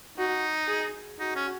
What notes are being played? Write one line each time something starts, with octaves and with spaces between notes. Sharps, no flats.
D#4 F#4
G#4
D#4 F#4
C#4